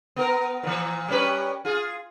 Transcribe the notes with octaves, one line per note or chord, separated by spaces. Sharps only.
B3 A#4
A#2 E3
G3 C#4 B4
F4 G#4